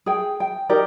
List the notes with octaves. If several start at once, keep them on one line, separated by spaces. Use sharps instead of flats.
G#4 G5
G5
D#4 G4 A#4 D5